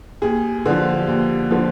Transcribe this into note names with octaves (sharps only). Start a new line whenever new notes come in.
D#2 G#4
D3 F3
D#2
D3 F3